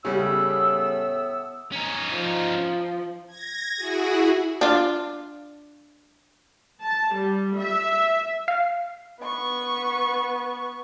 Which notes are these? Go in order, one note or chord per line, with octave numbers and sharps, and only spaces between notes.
A2 C#3 G3 B3 E6
C#4 D#4
F3
G#6 A#6
E4 F#4 G#4
D4 F4
A5
G3
E5
F5
B3 C#6